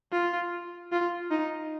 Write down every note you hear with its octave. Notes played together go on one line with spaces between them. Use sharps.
F4
F4
D#4